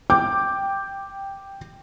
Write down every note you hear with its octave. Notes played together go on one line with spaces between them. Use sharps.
G5 D6 G6